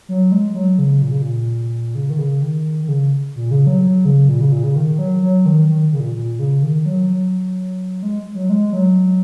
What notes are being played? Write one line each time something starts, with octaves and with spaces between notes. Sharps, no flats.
F#3
G#3
F#3
C#3
A#2
C#3
A#2
C#3
D#3
C#3
D#3
D#3
C#3
A#2
C#3
F#3
F#3
C#3
A#2
C#3
A#2
C#3
D#3
F#3
F#3
D#3
D#3
C#3
A#2
A#2
C#3
D#3
F#3
F#3
G#3
F#3
G#3
F#3